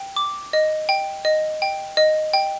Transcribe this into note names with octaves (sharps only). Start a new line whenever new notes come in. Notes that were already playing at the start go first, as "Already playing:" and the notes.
Already playing: G5
D6
D#5
G5
D#5
G5
D#5
G5